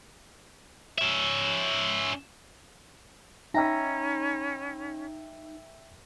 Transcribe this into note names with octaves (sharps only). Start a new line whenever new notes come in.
C#4 E5
C#4 D#4 E5 G5 A#5 B5 E6